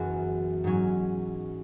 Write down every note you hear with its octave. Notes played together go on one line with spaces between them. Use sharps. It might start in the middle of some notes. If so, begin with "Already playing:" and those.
Already playing: F#1 F#2 E3 B3 C#4 F#4 G#4
G#2 F#3 C#4